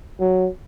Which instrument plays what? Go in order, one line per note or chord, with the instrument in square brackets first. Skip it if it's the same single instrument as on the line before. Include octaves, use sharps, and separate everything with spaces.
[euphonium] F#3